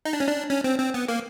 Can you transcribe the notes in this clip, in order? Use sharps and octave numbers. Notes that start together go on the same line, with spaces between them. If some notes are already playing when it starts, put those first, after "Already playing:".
D#4
D4
C#4
D4
C#4
C4
C4
B3
A#3